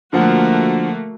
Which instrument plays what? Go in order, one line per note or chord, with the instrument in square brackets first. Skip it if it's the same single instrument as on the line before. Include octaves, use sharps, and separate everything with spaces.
[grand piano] D3 F3 F#5 [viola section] A3 A#3 F#4